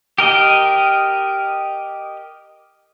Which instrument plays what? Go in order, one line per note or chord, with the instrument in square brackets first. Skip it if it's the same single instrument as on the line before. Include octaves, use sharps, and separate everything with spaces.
[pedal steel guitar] G4 A#4 D#5